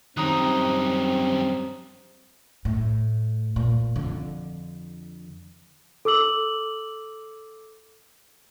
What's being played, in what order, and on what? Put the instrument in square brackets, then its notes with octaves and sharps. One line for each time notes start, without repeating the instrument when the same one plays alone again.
[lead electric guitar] F#2 G3 [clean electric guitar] D#3 [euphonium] C4 [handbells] A#5 D#6 F#6
[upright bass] A2
A#2
F2 D3
[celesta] A4 D6 E6 F#7